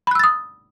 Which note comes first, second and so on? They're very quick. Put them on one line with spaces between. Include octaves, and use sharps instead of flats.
B5 F#6 E6 A6 D#6